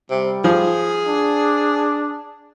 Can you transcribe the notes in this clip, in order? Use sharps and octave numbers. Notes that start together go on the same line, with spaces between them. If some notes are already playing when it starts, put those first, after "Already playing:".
C3 G3
F3 G#4
D4